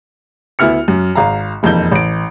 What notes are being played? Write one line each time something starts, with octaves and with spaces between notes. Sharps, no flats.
D2 B3 E4 F6 C#7
F#2
G#1 F5 A#5
E1 F2 A#3 D#4 G6 G7
A1 D7